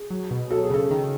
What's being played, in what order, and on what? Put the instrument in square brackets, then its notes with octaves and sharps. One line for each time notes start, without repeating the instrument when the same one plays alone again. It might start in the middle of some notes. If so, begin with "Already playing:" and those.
Already playing: [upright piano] G#4
[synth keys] F#3
B2
[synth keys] F#3 [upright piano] A4
[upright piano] G#4
[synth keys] C#3 [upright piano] A4
[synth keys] D#3